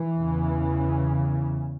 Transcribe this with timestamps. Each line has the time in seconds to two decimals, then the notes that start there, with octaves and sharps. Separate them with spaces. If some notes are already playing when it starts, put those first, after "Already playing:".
Already playing: E3
0.16 E2 C#3